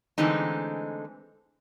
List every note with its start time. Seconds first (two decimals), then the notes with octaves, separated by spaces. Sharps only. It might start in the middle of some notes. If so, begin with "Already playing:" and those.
0.18 D3 E3 G#3 A3 C4 D#4